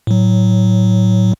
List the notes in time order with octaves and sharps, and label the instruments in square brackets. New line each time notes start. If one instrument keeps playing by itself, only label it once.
[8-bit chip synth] A2 F#3